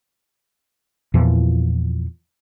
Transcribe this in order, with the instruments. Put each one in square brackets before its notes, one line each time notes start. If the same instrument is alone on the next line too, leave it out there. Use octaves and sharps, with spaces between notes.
[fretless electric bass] E2 A#2 E3 F3